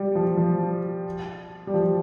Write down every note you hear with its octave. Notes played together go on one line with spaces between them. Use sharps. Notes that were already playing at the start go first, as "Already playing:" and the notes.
Already playing: G3
F3
F3
G3
F3